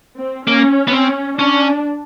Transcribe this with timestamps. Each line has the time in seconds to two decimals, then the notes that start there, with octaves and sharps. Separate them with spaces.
0.17 C4
0.47 A#3 C#4
0.88 B3
0.92 C4 C#4
1.39 C#4 D4